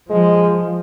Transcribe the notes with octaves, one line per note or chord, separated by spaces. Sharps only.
F3 G#3